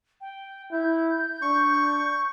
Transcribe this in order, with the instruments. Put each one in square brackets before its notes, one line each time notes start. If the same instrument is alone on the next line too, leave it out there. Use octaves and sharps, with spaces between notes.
[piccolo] G5
[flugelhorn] E4 [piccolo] G6
[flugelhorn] D4 [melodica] C#6